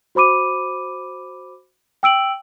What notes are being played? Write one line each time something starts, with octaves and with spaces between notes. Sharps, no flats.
F#4 C5 B5 D6 D#7
G5 E6 D7 F#7